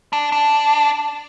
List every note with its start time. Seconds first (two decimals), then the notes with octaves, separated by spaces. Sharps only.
0.13 D4
0.32 D4